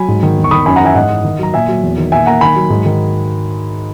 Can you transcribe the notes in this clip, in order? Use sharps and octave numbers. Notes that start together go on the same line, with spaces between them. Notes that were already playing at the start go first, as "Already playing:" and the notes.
Already playing: F#3 G#5 B5
G#2
D#3
E2
C#6
D#3 B5 D#6
F#2 G#5 B5
F#5 A#5
E3
E5 G#5
G#2 D#5 F#5
E3
D#3
F#3 A#5
A#2 E5 G#5
F#3
E2
D#3
A#2 E5 G#5
A#3 F#5 A#5
D#3 G#5 B5
F#3
G#2
D#3